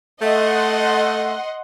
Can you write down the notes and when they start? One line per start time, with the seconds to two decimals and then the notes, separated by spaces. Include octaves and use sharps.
0.21 A3 D#5 F#5 C6